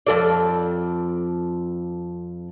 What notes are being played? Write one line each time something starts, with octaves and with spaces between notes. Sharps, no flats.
F2 A4 D5